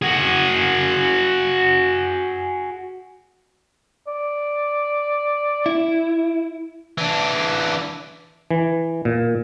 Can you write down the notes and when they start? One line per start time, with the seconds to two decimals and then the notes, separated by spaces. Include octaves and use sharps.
0.02 F#4 G#4
4.07 D5
5.66 E4
6.98 E3 D4
8.51 E3
9.05 A#2